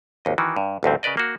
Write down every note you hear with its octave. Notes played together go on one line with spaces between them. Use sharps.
G#1 D#2 D#5
D#3 E3 F#4
G2
A1 D2 G2 C4
C#3 A#4 B4 D5 D#5
A#3 F#4